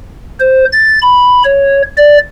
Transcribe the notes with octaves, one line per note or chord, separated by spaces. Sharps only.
C5
A6
B5
C#5
D5